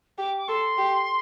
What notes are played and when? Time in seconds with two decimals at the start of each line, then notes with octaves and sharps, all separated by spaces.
0.18 G4 D6
0.38 D6
0.48 A4 C6
0.78 G4